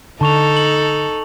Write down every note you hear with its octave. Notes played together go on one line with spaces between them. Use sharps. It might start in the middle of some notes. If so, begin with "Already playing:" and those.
D3 D#4 A4 A5 C#6 F7
F#7